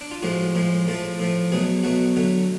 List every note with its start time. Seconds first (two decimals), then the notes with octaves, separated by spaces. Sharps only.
0.01 D4
0.11 F4
0.22 A2 F3 G#3 F#4
0.55 A2 F3 G#3
0.87 A2 F3 A3 A4
1.19 A2 F3 A3
1.52 B2 F#3 A3 G#4
1.83 B2 F#3 A3 F#4
2.16 D3 F#3 A3